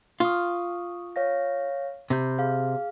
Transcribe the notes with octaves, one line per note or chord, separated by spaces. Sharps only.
F4 C#6 D#6
C#5 F5 A#6
C3 B5 G6
G#4 F5